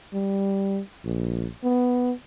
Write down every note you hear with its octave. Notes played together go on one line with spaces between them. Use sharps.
G3
A#1
B3